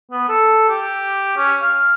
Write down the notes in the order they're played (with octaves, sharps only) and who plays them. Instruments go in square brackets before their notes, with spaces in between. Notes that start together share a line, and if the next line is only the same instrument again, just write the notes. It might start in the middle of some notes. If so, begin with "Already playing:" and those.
[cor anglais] B3
A4
G4
C#4
F5